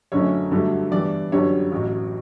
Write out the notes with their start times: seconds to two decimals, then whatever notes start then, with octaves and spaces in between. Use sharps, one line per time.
0.12 F#1 F#2 D3 A3 C#4 C#5
0.51 G2 D3 F#3 A3 D4
0.91 G2 E3 B3 D5
1.32 G1 F#2 D3 G3 C#5
1.72 A1 A2 F#3